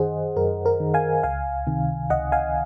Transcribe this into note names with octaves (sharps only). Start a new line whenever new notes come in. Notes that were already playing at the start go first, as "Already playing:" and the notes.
Already playing: F#2 D#3 G#4 C5 D#5 F#5
F#2 A#4
A#4
D#3
F5 G#5
C#2 F5 G#5
C3 D#3
C#2 D#5 F#5
F5 G#5